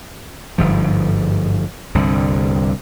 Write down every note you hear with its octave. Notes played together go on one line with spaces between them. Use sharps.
G1 G#2 F3
C2 G2 D3